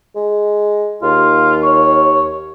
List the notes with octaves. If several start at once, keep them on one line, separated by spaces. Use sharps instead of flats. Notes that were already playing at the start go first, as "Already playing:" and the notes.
G#3
D#2 F4
C#5